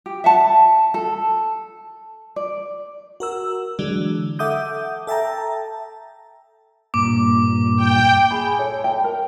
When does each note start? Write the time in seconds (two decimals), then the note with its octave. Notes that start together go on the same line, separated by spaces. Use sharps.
0.06 G4
0.24 E5 F#5 A5
0.94 A4
2.36 D5
3.20 F#4 A#4 E6
3.79 D3 E3 F#3 G#3 D4
4.39 A4 E5 F#5 D6 D#6 G6
5.07 A4 E5 G5 A5 A#5
6.94 G2 A#2 A#3 D6
7.77 G5
8.31 G#4 B5
8.59 A4 C#5
8.84 G5
9.04 A#4